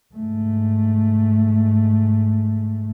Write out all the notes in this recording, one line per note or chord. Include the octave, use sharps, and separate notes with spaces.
G#2 A3